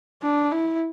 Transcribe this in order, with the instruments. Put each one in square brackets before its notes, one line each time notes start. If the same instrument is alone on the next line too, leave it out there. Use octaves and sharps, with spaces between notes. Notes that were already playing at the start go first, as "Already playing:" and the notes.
[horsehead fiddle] D4
E4